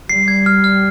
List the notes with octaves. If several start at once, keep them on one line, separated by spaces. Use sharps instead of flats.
G3 C7
G#6
F6
F6